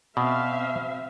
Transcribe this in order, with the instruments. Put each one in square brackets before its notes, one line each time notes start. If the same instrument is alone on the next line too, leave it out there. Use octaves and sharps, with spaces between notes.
[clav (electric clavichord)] B2 [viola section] C4 E5 F5